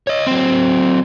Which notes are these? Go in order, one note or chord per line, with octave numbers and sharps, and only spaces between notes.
C#5 D#5
F#3 C4